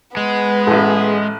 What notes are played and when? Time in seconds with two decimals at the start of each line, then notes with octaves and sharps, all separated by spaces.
0.17 G#3 B3 B4
0.67 A1 A2 G#4